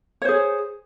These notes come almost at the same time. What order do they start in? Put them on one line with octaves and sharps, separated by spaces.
C#5 C5 G#4